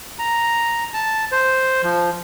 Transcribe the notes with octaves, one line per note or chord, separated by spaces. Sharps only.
A#5
A5
C5
F3